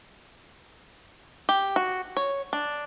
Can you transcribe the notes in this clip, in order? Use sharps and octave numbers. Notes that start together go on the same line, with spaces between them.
G4
F#4
C#5
D4